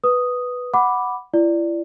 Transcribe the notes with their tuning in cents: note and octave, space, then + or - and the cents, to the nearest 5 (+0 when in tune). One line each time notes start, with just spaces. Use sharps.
B4 +0 D#6 +0
F#5 +0 B5 +0 D6 +0
E4 +40 D5 +0